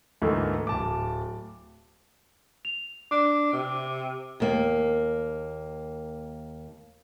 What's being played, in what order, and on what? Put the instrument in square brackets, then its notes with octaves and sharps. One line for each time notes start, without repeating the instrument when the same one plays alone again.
[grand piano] D2 G#2 E3 A3 A#3
D1 A5 D6
[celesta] F7
[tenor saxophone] D4 [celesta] D6
[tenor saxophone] C3
[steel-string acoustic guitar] D#2 A#3